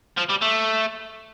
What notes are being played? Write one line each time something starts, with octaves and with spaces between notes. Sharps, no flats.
F3
G3
A3